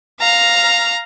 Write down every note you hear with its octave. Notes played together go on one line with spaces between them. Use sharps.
F5 A#5